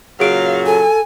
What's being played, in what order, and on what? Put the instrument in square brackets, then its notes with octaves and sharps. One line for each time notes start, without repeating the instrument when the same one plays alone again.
[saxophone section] A#2 C#3 F#3 [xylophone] G#4 D7 [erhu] F5
[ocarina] A4 [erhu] G#5